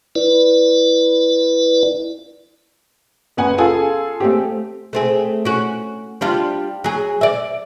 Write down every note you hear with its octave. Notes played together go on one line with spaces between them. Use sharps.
E4 B4 D5
F#1 B3 F#5 G#5
F4 G#4 A4 G#5
A3 C4 G4
A3 C4 G#4
C#4 F#4
G3 D4 F4
F#3 G#4
D5 E5